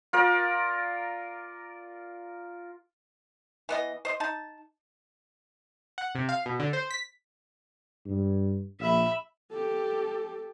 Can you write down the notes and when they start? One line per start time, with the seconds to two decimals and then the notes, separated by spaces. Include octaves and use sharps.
0.13 F4 A#4 D5
3.69 E3 B3 D#5
4.05 C5 D#5
4.20 D#4 A5
5.98 F#5
6.15 C3
6.29 F5
6.46 B2
6.60 D3
6.73 C5
6.91 B6
8.06 G2
8.80 A#1 E5 B5
9.51 G4 A4